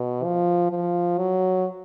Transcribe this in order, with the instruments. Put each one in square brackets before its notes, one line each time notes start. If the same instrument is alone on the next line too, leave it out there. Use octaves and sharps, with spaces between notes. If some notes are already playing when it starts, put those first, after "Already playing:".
Already playing: [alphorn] B2
F3
F3
F#3